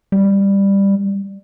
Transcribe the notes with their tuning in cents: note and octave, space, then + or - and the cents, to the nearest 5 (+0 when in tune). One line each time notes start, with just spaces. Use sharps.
G3 +10